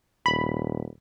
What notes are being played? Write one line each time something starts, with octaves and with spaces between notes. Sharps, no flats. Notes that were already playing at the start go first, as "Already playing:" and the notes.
D#1 B5